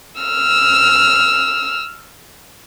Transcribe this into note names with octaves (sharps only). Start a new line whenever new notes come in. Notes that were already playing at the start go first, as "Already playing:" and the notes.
E6 F6